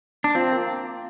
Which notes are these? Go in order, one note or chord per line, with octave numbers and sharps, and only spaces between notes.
D4
F3 C4
A#3